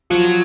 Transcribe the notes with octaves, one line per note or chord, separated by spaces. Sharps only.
F3 F#3